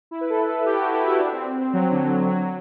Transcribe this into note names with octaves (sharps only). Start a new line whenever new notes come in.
E4
B4
A4
A4
G4
F#4
E4
E4
D4
C4
C4
F#3
D3
F#3